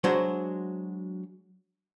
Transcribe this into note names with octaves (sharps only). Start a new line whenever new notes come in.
F#3 G#3 D4 F#4 C5